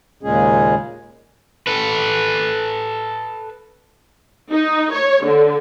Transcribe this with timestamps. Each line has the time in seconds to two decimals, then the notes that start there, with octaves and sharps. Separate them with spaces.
0.23 D#2 A#2 C#3 G#3 C#4 G#4
1.67 A4 B4
4.51 D#4
4.93 C#5
5.25 D3